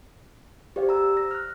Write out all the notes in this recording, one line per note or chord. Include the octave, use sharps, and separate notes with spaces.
G4 C5 D5 F5
A#5 E6
A#6
F6 F#6